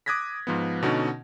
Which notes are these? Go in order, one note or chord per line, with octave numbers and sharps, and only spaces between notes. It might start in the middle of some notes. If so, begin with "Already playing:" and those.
D6 D#6 F#6 G#6 A#6 B6
G#2 F3 B3
B2 D3 C#4 D#4 F#4